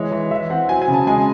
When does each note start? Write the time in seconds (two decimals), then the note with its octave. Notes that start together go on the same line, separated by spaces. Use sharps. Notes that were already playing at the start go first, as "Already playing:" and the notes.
Already playing: E3 G#3 C#5
0.12 E3
0.31 E3 E5
0.50 C4 F#5
0.69 F#3 G#5
0.82 G#5
0.88 C#3
0.94 A5
1.07 G#3 G#5